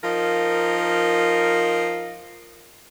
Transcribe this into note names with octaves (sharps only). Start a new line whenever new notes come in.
F3 D#4 A#4